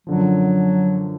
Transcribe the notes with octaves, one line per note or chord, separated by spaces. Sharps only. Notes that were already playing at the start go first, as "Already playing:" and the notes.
F#2 D3 F3 F#3